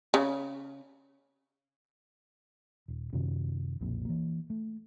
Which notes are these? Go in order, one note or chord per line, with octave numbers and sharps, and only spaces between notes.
C#3
D#1
F#2 C3 D#3 C#4
B1 F2 A#2
E3 A#3
A3